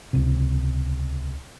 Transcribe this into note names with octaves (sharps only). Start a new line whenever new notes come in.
D#1 C#2 C3